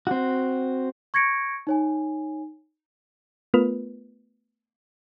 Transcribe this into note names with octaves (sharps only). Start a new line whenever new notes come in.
C4 F#4
C#6 G#6 A#6 C#7 D7
D#4 C#5 G#5
A3 B3 F4 A#4 B4